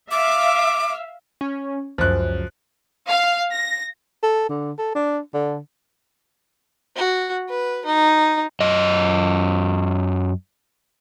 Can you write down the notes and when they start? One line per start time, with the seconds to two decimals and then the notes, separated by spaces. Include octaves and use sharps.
0.11 E5 F5 D6
1.41 C#4
1.98 C#2 F#2 F3 F#6
3.10 F5
3.52 A#6
4.23 A4
4.49 D3
4.78 A4
4.95 D4
5.34 D3
6.96 F#4
7.49 B4
7.86 D#4
8.60 F#2 D#5